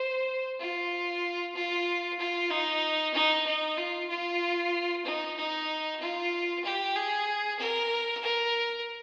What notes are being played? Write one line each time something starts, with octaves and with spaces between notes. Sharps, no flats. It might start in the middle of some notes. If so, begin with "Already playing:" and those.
Already playing: C5
F4
F4
F4
D#4
D#4
D#4
F4
F4
D#4
D#4
F4
G4
G#4
A#4
A#4